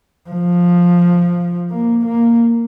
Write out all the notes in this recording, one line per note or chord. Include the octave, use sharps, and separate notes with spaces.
F3
A#3
A#3